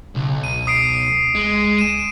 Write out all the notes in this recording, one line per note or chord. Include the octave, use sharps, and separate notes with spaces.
B1 C#3
C#2 D#7
D#6 C7 D7
G#3
D#7 E7